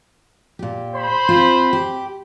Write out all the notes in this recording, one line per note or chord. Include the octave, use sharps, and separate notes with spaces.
A#2 G4
C5 B5
C4 F4
G4